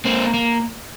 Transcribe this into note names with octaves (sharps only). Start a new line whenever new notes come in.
A#3 C4
A#3